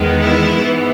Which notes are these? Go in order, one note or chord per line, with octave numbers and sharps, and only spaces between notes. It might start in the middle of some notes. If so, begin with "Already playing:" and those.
Already playing: E2 D#3 G#3 B3
E4
G#2 E3 B3